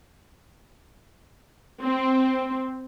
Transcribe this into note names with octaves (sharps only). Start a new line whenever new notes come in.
C4